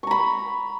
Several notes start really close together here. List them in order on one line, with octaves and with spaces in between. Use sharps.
C#6 A#5 B5